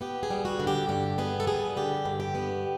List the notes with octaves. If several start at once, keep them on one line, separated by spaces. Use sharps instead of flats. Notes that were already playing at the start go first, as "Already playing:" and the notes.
B3 G4
G#4
G3
F#4
D3
G4
G2 G4
B3 G#4
A4
G3 G#4
D3 G4
G2
G4
B3